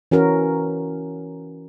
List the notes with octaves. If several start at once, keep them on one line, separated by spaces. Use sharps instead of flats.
E3 C#4 F#4 A#4